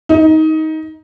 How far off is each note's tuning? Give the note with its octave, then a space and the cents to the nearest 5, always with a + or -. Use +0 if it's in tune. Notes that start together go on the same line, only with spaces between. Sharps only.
D#4 +20